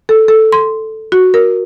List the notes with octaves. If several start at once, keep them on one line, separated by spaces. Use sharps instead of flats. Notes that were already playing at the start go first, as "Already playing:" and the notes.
A4
A4
C6
F#4
A#4